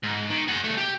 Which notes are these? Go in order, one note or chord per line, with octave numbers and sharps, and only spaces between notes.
G#2
D#3
G#4 F#5
C2 A3
G4